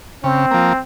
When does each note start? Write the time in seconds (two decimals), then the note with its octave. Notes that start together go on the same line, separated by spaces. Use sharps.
0.24 C#3 C4
0.51 F3 A#3